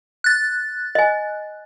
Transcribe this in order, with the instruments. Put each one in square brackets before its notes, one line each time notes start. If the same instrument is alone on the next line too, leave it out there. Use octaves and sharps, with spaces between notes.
[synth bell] F#6 A6
[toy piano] D#5 G#5